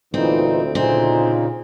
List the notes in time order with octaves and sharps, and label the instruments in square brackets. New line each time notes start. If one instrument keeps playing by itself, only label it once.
[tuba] D2 [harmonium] A#2 E3 D#4 [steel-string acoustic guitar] C4
[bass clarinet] A#2 [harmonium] C#3 D#4 [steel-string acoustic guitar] C4